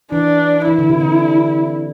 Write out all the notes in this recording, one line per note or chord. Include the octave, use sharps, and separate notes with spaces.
E3 D4
E3 E4
D3
C3
D3